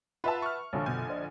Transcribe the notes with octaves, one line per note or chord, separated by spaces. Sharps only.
F4 B4 E5 F#5 A5
C#6 F6
A#1 D3 C#5 F5 A5
F#2 B2 G#5 G6
C5 D5 D#5